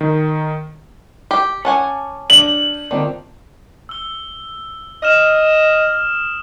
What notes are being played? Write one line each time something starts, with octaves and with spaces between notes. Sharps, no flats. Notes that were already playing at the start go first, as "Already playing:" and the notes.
D#3
G4
C#4 F#5 G#5 A5 D6
D4 F#7
D3 D#3 C4 F4
E6 G7
D#5 D#6 F6 E7